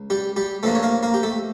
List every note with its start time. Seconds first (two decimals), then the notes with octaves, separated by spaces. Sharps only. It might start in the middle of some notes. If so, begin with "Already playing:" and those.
Already playing: C#2
0.10 G3 G4
0.36 G3 G4
0.63 G2 F3 A3 A#3 D4 A4
0.75 C#5
0.83 A#3 A#4
1.03 A#3 A#4
1.14 G4
1.23 A3 A4